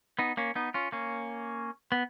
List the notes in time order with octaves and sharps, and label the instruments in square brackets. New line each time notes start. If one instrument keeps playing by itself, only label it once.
[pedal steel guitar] B3 D#4
A#3 C#4
B3 D#4
C#4 F4
A#3 C#4
B3